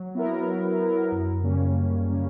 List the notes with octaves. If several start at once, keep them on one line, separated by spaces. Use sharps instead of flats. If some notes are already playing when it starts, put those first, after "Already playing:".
Already playing: F#3
B3 E4 A#4
F#3
B3 E4 A#4
F#2
C#3 G3 A#3 C#4
F#2
C#3 G3 A#3 C#4